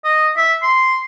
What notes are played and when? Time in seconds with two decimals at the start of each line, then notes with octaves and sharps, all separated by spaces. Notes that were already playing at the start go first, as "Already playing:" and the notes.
0.04 D#5
0.37 E5
0.63 C6